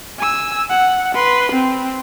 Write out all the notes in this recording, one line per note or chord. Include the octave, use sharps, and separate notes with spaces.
G#5 E6
F#5
B4 C6
C4